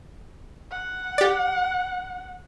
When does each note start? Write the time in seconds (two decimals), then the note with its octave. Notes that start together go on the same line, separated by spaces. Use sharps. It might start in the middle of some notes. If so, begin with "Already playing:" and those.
0.71 F#5
1.18 G4 D5